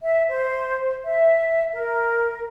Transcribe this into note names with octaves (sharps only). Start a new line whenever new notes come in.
E5
C5
E5
A#4